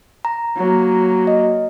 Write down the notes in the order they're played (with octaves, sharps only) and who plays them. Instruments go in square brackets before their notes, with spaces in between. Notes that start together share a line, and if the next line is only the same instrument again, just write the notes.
[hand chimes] A#5
[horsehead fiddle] F#3 A#3
[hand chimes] D#5